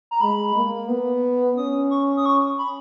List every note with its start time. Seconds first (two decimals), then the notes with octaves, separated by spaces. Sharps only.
0.11 A#5
0.21 G#3 B5
0.56 A#3
0.89 B3
1.57 C#4 D#6
1.91 C#6
2.17 D#6
2.26 C#6
2.58 B5